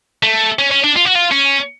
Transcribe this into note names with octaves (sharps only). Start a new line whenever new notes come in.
A3
C#4
C#4
D4
F4
F#4
F4
C#4